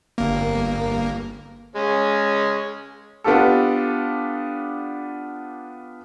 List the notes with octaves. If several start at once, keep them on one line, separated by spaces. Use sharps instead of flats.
G1 A#3
G#3 C#4
B3 D4 F4 G4 A4